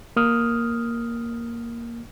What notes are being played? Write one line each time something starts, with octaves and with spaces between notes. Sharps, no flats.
A#3 D#6 F6